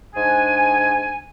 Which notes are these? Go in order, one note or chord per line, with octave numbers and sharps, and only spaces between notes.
G#2 D4 G#5